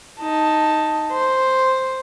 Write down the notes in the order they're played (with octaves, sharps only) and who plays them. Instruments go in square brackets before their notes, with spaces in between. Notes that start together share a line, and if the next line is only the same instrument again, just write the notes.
[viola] D#4 A5
C5